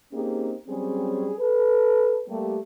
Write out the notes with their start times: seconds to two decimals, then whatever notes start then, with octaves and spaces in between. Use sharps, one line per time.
0.12 A#3 C4 C#4 D#4 G4 G#4
0.68 F#3 G3 C4 C#4 G#4
1.38 A4 B4
2.28 G3 A3 A#3 G4